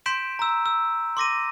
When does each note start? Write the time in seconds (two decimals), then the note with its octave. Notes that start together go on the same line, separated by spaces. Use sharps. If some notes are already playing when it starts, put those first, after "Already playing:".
0.06 C6 G6 B6 D7 E7
0.39 A#5 E6
0.66 E6
1.17 C6 D6 A#6 D#7